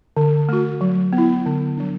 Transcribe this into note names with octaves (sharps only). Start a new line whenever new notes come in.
D3
A3 F#4
F#3
B3
E4
D3
F#3 D4